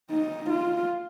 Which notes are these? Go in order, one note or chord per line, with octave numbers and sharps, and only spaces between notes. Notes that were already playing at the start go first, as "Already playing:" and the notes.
D#4
F4